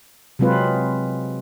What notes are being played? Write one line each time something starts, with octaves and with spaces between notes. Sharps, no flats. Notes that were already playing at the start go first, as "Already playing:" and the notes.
C3 F#3 G#3 C4 F4 B4